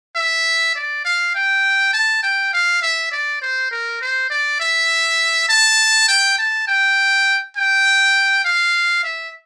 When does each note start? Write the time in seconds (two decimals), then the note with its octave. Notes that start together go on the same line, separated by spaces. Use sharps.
0.15 E5
0.75 D5
1.05 F5
1.35 G5
1.93 A5
2.23 G5
2.53 F5
2.82 E5
3.11 D5
3.41 C5
3.71 A#4
4.01 C5
4.30 D5
4.60 E5
5.49 A5
6.08 G5
6.38 A5
6.67 G5
7.57 G5
8.44 F5
9.04 E5